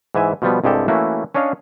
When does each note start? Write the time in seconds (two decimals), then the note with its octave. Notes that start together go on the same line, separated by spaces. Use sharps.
0.15 G#2 E3 E5 G#5
0.42 B2 F3 G3 B3
0.64 C2 G2 G#3 G4 A4
0.88 E3 A3 A#3 C#4 E4 F#4
1.35 C#4 D4 C#5 D#5 F5